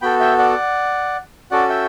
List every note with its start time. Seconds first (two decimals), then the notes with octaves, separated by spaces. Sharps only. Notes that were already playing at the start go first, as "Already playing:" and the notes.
0.01 B3 F#4 A4 G5 B5
0.20 E5 G5
0.39 D5 F#5
1.51 C#4 F#4 A4 D5 F#5
1.69 E5 G5